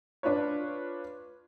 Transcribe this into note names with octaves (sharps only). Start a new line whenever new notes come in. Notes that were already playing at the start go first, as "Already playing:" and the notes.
D4 F4 B4 C#5